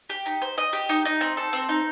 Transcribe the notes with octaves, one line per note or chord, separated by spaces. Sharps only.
G4
D#4
C5
D#5
G4
D#4
D#4
C4
A4
C4
D#4